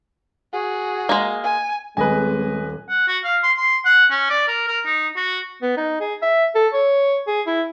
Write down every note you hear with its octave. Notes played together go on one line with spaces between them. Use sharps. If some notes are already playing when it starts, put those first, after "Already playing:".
F#4 G#4
G#3 A#3
G#5
D#1 G#3 C4 B4 D#5 G#5
F#5
F#4
F5
C6
C6
F#5
C#4
D5
A#4
A#4
D#4
F#4
B3
D#4
G#4
E5
A4
C#5
G#4
E4